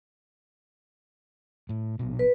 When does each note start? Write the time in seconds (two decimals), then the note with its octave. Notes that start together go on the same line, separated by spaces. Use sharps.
1.69 A2
1.99 A#1 B2
2.19 B4